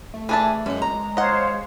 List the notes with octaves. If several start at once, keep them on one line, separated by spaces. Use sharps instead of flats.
A3
E3 D4 G#4 E5 A5
F#2 G#3
A#5
C5 C#5 D#5 F5 F#5